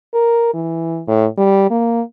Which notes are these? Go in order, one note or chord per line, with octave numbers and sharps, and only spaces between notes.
A#4
E3
A2
G3
A#3